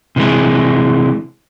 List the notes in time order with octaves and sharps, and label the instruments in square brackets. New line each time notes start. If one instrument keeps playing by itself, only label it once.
[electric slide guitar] C3 E3 G#3